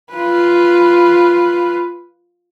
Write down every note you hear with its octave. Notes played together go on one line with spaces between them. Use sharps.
F4 B4